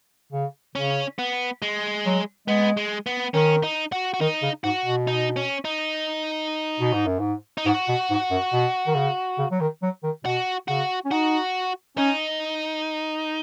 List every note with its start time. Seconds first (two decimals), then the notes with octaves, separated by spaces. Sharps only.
0.32 C#3
0.75 C#3 C#4
1.19 B3
1.62 G#3
2.06 F#3
2.48 G#3 B3
2.77 G#3
3.06 B3
3.34 D#3 C#4
3.63 D#4
3.92 F#4
4.14 F#4
4.20 D#3 D#4
4.42 C#3
4.64 G#2 F#4
4.85 B2
5.07 D#4
5.36 C#4
5.65 D#4
6.80 B2
6.93 G#2
7.06 F#2
7.19 G#2
7.58 D#4
7.66 G#2 F#4
7.88 B2
8.10 G#2
8.31 F#2
8.53 B2
8.87 D#3
8.95 C#3
9.38 C#3
9.51 F#3
9.60 D#3
9.83 F#3
10.03 D#3
10.25 B2 F#4
10.68 C#3 F#4
11.05 C#4
11.11 D#4 F#4
11.97 C#4 D#4